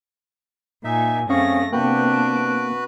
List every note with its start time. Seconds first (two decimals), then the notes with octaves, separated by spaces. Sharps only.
0.84 A#2 D#4 E5 G#5
1.29 F#2 A3 C4 C#4 G#4 F5 C#6 A#6
1.73 C3 A#3 B3 D4 F#4 B4 G5 F#6
2.13 D7